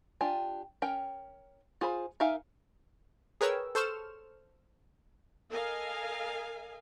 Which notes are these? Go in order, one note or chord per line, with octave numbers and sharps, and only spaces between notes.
D4 F4 G4 G5 G#5
C#4 A#4 G5
F4 G#4 C5 B5
D#4 A#4 E5 F5 G#5
G#4 A#4 B4 C#5 G5 E6
A4 C5 C#6 F6 E7
A4 A#4 D#5 F5 G#5